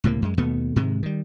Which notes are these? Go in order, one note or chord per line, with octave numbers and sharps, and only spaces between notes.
C#2 A2 C3 A#3
F#2 G#3
D#2 B2 A3 B3
G#2 C3 D#3 G#3
D#3 G3